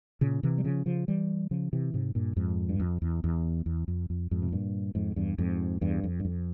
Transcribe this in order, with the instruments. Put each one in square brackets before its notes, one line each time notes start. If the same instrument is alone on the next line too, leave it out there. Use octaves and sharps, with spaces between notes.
[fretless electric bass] A#2 C#3
C3 E3
G3
C#3 F3
C#3 F3
E3 G3
C#3 F3
C3 E3
G#2 C3
G2 A#2
F2 G#2
G2
F2
E2
E2
E2
F2
F2
F2 G#2
C3
G2 A#2
F2 G#2
E2 G2
F2 G#2
E2 G2
F2
G2
F2